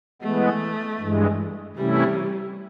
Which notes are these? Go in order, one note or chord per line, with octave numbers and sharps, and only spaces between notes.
E3 G#3 A3 B3
G2 E3 G#3
C3 E3 G3 A3 C#4 E4